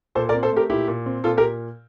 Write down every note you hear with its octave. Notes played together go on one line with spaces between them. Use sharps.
A#2 A4 C5
A#4 D5
C4
A4 C5
A3 G4 A#4
A#2 E4 G4
A#2
C4
A#2 F4 A4
G4 A#4